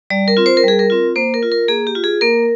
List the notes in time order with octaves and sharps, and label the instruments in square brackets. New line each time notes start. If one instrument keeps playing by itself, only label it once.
[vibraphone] G3 D5
A#4
C4 F4
C5
A#4
G3 G#4
A#4
C4 F4
A#3 C5
A#4
F4
A#4
A#3 G#4
G4
F4
G#4
A#3 A#4